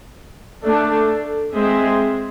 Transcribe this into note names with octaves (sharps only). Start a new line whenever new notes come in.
A3 D4 A4
G#3 C4 G#4 C5 E5